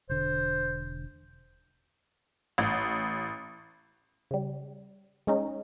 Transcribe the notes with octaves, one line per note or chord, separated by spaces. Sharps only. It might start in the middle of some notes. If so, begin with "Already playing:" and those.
E1 D3 C5
A1
C#3 G3
G#3 C#4 D#4